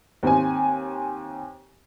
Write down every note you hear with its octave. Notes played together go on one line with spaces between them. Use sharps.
D#2 C4 G#5